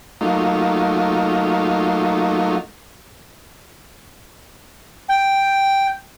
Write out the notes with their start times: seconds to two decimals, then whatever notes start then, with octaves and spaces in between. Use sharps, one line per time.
0.21 F#3 A3 A#3 D#4 F4
5.09 G5